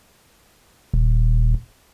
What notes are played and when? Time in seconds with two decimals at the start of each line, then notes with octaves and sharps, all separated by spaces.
0.93 D#1